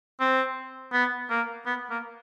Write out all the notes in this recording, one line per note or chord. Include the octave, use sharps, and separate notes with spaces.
C4
B3
A#3
B3
A#3